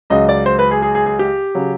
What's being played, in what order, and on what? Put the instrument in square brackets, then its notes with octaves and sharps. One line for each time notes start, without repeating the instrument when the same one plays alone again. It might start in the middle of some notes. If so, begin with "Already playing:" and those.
[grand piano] C#2 C#3 F#3 D#5
D5
C5
B4
G#4
G#4
G#4
G#4
G4
C#3 F#3